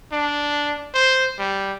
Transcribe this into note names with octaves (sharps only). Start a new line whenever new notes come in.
D4
C5
G3